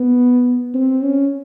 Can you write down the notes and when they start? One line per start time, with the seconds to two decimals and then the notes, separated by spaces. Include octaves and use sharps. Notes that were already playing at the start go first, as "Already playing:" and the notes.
Already playing: B3
0.74 C4
1.02 C#4